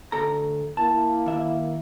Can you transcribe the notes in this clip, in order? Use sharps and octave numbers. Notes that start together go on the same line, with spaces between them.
D2 A4 A#5
A#3 E4 A5
D#2 E5